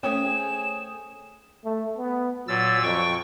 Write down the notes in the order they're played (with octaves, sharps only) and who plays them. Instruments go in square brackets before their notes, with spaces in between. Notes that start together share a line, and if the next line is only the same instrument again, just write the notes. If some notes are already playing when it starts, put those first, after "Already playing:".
[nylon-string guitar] A3 C4 C#4 [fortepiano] C#5 G5 D#6 [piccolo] E7
[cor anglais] G#4
[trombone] A3
B3
[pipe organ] A#2 E6 A6 [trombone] F#3
[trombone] F2 [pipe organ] G5 C#6